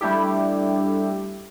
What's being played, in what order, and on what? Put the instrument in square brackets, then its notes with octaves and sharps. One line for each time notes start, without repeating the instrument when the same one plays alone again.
[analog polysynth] G3 A3 D4 E4 G4